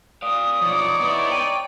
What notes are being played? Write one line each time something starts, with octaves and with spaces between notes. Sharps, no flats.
D5 F5 D#6
B1 F3 D#4 C#5 D5
B3 E4
G5 D#7